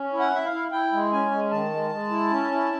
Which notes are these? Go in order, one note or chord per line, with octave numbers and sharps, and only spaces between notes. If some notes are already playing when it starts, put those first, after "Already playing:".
Already playing: C#4
E4
F#5
E4 E5
F5
E4
E4 G5
G#3
C#4 G#5
G#3
D#3 A5
G#3
G#3
E4
C#4
E4